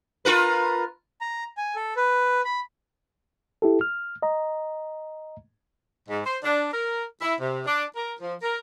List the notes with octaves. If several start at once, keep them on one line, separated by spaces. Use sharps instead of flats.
F4 A#4 B4
A#5
G#5
A4
B4
B5
E4 G4 A4
F6
D#5 A#5
G#2
C5
D4
A#4
E4
C3
D4
A#4
F3
A#4